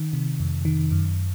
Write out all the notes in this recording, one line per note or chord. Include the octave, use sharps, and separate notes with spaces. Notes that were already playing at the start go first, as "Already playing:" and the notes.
Already playing: D#3
C3
F2
D#3
F#2